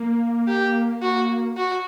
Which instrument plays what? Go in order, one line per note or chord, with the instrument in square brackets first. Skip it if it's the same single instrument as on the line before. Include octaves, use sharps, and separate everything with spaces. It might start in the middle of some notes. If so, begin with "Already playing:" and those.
Already playing: [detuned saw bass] A#3
[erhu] G4
F#4
F#4